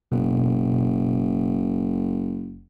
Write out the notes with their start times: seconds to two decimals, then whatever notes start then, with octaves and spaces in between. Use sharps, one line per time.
0.12 F#1 B2